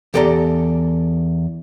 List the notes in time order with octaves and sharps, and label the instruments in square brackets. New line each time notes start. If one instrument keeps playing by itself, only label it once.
[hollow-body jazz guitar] E2 G4 A4 D5 A#5